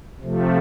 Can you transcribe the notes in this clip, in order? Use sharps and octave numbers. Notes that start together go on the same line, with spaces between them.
C3 F3 A3